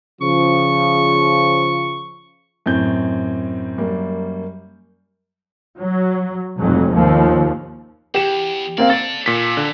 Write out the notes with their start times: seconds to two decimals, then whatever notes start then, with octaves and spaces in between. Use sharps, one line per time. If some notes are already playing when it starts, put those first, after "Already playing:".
0.21 C#3 F3 C#6
2.66 F#2 A2 C4 G6
3.78 F#2 G3 A#3
5.79 F#3
6.59 F1 F2 G#2 F#3
6.92 D#2 F3
8.14 E2 G4 E7
8.78 A#3 C4 D5 F5
8.90 A4 D5 A6
9.26 A#2 D#3 A4 B6
9.57 D3